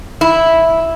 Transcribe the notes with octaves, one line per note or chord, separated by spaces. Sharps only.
E4